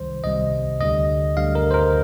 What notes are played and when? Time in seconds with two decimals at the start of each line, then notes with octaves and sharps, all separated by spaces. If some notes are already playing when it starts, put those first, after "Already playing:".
Already playing: C2 C3 D#3 G3 C5
0.24 C2 C3 D#3 G3 D#5
0.80 D2 D3 G3 D#5
1.37 D2 D3 G3 F5
1.55 A#4
1.71 C5
1.74 A#4